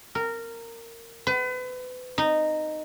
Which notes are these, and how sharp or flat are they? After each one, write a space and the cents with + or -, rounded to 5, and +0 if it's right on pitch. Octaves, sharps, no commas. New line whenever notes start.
A#4 -15
B4 +35
D#4 -10